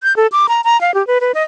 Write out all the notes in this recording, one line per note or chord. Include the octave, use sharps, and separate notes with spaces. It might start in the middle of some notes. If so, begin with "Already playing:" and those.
G6
A4
D6
A#5
A#5
F5
G4
B4
B4
D#5